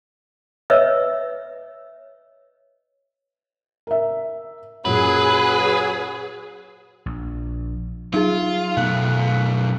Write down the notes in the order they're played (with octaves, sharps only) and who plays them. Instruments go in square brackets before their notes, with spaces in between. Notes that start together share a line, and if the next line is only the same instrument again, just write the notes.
[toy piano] B4 C#5 D#5 E5 E6
[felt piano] A#4 E5
[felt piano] F#2 A#2 [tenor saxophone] F#3 [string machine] G#4 [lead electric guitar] B4
[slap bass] A#1
[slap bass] F#3 [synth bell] D#4 G#4 [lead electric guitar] F4
[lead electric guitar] F#2 A3 [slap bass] B2 B3 [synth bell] F5 F#6